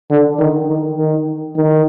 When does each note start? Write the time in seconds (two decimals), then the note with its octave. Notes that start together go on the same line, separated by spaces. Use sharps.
0.10 D3
0.39 D#3
0.68 D#3
0.98 D#3
1.56 D#3